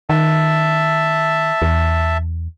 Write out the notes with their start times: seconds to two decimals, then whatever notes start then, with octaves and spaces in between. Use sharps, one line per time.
0.09 D#3 E5 A5
1.62 E2